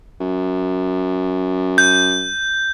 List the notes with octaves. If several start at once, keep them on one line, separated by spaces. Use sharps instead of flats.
F#2
G6